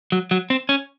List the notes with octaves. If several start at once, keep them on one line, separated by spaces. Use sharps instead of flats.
F#3
F#3
C4
C#4